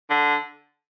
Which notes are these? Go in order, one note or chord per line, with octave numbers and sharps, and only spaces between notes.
D3